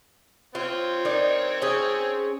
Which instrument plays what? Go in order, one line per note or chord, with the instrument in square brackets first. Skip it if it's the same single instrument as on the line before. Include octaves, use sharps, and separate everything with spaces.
[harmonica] C4 C#5 [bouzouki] F4
[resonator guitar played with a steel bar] D#4 D5 [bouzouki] A#4
[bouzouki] C#4 G#4